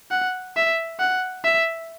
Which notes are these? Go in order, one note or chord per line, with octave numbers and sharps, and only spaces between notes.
F#5
E5
F#5
E5